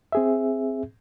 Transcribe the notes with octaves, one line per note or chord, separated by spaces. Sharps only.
C4 G#4 E5